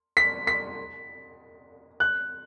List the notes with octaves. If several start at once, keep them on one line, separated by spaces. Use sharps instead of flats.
B6
B6
F#6